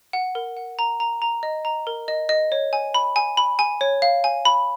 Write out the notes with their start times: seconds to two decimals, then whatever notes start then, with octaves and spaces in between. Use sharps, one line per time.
0.13 F#5
0.35 A#4
0.57 F#5
0.79 A#5
1.00 A#5
1.22 A#5
1.43 D#5
1.65 A#5
1.87 A#4
2.08 D#5
2.29 D#5
2.52 C#5
2.73 G#5
2.94 B5
3.16 G#5
3.37 B5
3.59 G#5
3.81 C#5
4.02 F5
4.24 G#5
4.45 B5